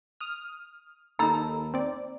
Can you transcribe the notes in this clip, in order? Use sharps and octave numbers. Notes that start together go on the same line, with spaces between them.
D#6 F6
D#2 D#4 A4 A#5 B5 E6
C4 D5